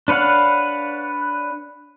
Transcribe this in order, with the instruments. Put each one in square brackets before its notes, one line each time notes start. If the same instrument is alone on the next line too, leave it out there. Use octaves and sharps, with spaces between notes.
[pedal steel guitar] D4 B4 C#5 F5 F#5